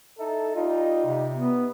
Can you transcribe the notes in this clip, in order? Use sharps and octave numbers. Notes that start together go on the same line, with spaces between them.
D#4 E4 A4
G3 D#4 F4
C3
B3